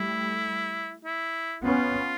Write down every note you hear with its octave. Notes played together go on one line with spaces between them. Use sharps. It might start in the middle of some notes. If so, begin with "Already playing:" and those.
Already playing: G3 A3 E4
E4
B3 C#4 F4